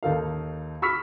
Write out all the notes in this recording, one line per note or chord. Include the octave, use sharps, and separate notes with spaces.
D#2 D#4 A4 F5
B5 C#6 E6 F6 B6